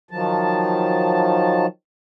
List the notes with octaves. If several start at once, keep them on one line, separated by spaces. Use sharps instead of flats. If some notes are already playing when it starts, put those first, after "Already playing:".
D#3 F3 F#3 A5